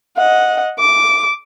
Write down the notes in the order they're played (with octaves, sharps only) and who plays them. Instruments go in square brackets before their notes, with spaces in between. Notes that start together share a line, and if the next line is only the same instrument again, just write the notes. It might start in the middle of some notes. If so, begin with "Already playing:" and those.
[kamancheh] D#5 F#5
D6